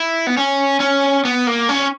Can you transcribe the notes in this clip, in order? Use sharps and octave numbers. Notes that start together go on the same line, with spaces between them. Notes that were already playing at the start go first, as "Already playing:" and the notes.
Already playing: E4
B3
C#4
C#4
B3
A#3
C#4